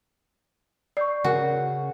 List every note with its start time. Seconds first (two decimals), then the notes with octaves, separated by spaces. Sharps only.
0.97 D5 C#6 G6 C7
1.24 C#3 F#4 A#4 G#5